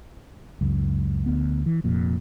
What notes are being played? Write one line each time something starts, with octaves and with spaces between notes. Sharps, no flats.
C#2 F#2
D2 B3
E3
F1 F2 A#2